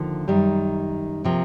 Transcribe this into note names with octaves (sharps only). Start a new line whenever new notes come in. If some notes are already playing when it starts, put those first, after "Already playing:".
Already playing: D#2 D3 F3 A#3
F#2 D#3 G3
C3 F3 A#3